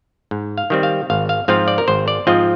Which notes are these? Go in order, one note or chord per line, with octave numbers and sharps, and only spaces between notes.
G#2
F5
D#3 G3 C4
F5
G#1 F5
F5
G#2 F3 C4 F4 F5
D5
A#4
G#1 C5
D5
G#2 F3 C4 F4 D#5